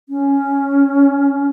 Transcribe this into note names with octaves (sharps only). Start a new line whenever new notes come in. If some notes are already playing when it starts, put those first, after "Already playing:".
C#4